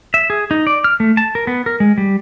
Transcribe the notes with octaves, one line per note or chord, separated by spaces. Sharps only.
E5
G#4
D#4
D5
F6
A3
A5
A#4
B3
A#4
G#3
G3